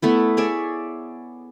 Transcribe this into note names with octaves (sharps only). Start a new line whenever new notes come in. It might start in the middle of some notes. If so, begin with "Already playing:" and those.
A3 B3 E4
G#4 C#5 D5 E5